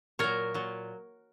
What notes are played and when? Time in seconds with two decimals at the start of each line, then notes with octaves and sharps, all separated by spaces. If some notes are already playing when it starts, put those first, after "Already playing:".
0.19 A#2 F#3 A#4 C#5
0.54 A#2 F#3